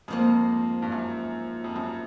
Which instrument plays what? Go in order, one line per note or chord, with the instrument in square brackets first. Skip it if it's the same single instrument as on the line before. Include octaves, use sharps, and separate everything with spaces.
[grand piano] F2 [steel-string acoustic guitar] G#2 F3 A#3
[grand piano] G2
F#2
F2
F#2